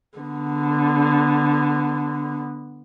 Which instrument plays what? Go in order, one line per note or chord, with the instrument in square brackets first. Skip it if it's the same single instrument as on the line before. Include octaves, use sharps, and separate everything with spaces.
[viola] D3 B3